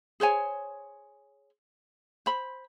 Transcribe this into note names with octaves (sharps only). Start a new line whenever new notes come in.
G#4 C5 C#5 G#5
C5 B5